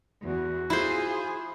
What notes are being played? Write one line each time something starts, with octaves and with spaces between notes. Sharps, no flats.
E2 F#4
E4 F4 G#4 C5